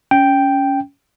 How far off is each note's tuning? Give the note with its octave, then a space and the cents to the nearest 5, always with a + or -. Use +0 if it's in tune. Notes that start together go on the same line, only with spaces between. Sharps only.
C#4 +15 G5 +0